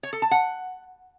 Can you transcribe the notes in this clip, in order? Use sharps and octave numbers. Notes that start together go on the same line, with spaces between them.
C#5
A4
A5
F#5